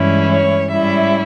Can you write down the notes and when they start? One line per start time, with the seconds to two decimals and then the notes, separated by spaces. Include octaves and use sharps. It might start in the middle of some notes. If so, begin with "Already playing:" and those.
Already playing: G2 E3 G#3 C#4 E4
0.29 C#5
0.70 G#2 G3 C#4 E4 E5